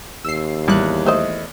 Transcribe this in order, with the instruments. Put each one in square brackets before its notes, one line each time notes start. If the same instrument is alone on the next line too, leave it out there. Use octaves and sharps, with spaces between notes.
[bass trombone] D#2 [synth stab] E6 C7
[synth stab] A1 G3 F#6 [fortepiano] E2
[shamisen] A3 C5 D#5